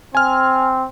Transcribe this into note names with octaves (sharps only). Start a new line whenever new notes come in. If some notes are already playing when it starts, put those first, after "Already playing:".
C4 G#5 F6